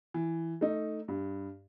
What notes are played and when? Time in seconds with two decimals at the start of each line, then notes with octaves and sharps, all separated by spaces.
0.14 E3
0.61 A3 D#4
1.08 G2